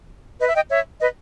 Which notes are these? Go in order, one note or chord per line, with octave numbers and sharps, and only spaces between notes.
B4 D#5
E5
D#5 G5
C#5 E5
B4 D#5